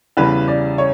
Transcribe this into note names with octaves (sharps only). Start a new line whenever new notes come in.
E2 C#3 E3 G3 B4
D5
C#5